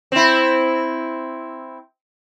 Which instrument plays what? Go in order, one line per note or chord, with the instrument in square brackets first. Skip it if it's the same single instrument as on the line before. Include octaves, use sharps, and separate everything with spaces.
[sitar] C4 E4